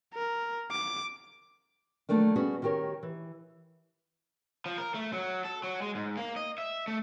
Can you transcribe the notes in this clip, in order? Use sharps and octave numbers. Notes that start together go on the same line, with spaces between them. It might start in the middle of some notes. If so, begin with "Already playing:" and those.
A#4
D6
D#3 F3 F#3 A3 A#3 D4
G3 B3 C#4 F#4 G#4
D#3 F#4 G4 A#4 C#5
E3
F3
A#4
A3
F#3
A4
F#3
G#3
G#2
A#3
D#5
E5
A3